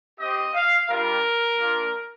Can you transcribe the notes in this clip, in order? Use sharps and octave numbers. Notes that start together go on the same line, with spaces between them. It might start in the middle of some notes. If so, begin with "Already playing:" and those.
C4 G4 D#5
F5
G3 D4 F4 A#4
A#3 D4 F4